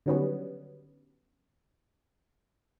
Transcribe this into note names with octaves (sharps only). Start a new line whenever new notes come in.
D3 D#3 F#3 G3 B3 C#4